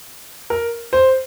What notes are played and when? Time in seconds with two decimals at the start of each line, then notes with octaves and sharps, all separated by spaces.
0.50 A#4
0.93 C5